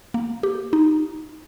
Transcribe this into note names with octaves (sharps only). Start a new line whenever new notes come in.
A#3
G4
D#4